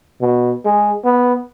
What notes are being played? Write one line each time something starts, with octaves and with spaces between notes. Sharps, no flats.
B2
G#3
B3